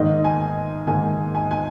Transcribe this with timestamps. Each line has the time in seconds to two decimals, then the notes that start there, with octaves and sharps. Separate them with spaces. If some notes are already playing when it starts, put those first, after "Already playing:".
Already playing: G#2 D#3 A#3 D#5
0.24 G#5
0.87 G#2 D#3 A#3 G#5
1.35 G#5
1.51 G#5